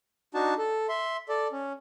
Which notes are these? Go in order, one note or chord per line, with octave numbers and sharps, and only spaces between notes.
D4 D#4 F#4 A5
A4
E5 C6
A4 D5
C#4